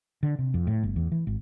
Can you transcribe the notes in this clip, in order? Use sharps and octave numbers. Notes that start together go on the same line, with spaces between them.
D3
C3
F2
A2
G1
E2
E3
G#1